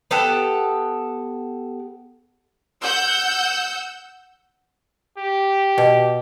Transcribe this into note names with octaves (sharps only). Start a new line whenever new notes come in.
B3 G4 A4 F#5
F#5 E6 G6
G4
B2